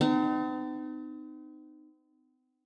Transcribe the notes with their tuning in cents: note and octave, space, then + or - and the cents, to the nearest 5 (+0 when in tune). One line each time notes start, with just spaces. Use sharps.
C4 -45 D#4 -25